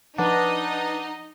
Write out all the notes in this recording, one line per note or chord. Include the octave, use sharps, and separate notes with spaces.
F3 D4 D#4 B4 D#5 F#5